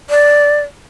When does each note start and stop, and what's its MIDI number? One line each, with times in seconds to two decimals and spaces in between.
0.10 0.59 74